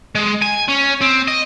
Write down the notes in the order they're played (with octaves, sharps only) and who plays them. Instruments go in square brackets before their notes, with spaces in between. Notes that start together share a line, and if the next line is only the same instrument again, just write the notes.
[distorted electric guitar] G#3
G#5
C#4
C4
D#5